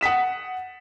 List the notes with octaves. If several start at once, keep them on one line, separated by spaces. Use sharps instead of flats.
F#5 D#6 B6 E7